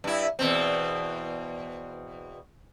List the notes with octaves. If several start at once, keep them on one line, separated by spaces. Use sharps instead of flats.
G2 E4
E2 B2 C4